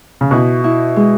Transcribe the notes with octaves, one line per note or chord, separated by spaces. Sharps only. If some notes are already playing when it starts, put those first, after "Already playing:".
C#3
B2 E4
E4
G#3